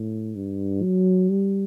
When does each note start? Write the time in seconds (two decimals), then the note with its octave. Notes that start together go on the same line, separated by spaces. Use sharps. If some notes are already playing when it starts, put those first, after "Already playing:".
Already playing: A2
0.35 G2
0.82 F#3
1.30 G3